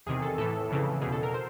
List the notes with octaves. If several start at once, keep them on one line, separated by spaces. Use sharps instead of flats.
E2 C3 D#3 G#4
A4
A2 E3 A4
F2 C#3 E3
E2 B2 G#4
A4
A#4
C5